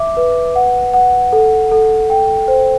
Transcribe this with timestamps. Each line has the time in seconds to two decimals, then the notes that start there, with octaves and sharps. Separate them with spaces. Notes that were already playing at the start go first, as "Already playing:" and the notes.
Already playing: E5 D6
0.17 B4
0.55 F#5
0.94 F#5
1.33 A4
1.72 A4
2.10 G5
2.48 C5